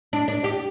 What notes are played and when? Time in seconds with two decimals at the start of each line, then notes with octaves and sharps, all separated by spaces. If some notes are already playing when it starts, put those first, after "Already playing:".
0.13 D4
0.28 D4
0.44 G4